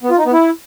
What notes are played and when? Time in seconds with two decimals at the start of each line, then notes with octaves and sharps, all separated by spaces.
0.03 B3
0.11 F4
0.18 D#4
0.25 B3
0.33 E4